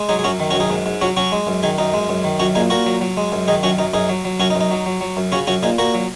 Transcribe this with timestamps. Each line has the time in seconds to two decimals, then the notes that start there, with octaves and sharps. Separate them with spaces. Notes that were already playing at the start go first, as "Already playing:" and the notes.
Already playing: G#3
0.09 F#3 D#4 G#4
0.19 G#4
0.24 F#2 C#4 F#4
0.40 D#3
0.50 C#4 F#4
0.55 F#2
0.60 D#4 G#4
0.70 G#2
0.86 G#2
1.01 F#3 C#4 F#4
1.17 F#3 C#4 F#4
1.32 G#3
1.47 F#2
1.63 D#3 D#4 G#4
1.78 F#2 D#4
1.94 G#3
2.09 F#2
2.24 D#3
2.39 F#2 C#4 F#4
2.55 A#2 D#4 G#4
2.70 A#2 F#4 A#4
2.86 F#3
3.01 F#3
3.17 G#3
3.32 F#2
3.48 D#3 D#4 G#4
3.63 F#2 C#4 F#4
3.78 F#2 D#4
3.93 F#2 D#4 G#4
4.09 F#3
4.25 F#3
4.39 F#2 C#4 F#4
4.50 D#4
4.56 F#2
4.61 D#4
4.71 F#3
4.86 F#3
5.01 F#3
5.17 F#2
5.32 C#3 C#4 F#4
5.47 F#2 C#4 F#4
5.63 A#2 D#4 G#4
5.78 A#2 F#4 A#4
5.94 F#3